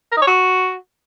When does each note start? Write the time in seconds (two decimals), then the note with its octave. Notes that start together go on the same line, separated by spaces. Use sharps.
0.12 A#4
0.17 D#4
0.22 C#5
0.27 F#4